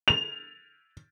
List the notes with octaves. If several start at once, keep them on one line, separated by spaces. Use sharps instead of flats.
F7